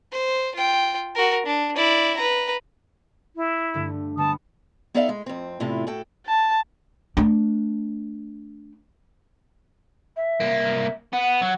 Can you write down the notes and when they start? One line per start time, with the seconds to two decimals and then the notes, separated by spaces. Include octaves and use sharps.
0.12 C5
0.56 F4 G5
1.15 F#4 A#4
1.46 D4
1.75 E4 D5
2.17 B4 A#5
3.35 E4
3.74 G2 D3 A3
4.17 D3 G3 B3 A5 D#6
4.94 B3 D#4 A4 D5 E5 F5
5.09 G#3
5.26 F2 C4
5.60 E2 A2 C3 E4 F4 A4
5.87 A2 F#4 A4 G5
6.27 A5
7.17 A3 D4
10.16 E5
10.40 C2 A#3
11.13 B3 F#5
11.42 F#3